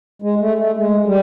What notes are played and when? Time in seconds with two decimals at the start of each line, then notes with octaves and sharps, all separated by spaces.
0.22 G#3
0.40 A3
0.58 A3
0.77 G#3
1.06 G3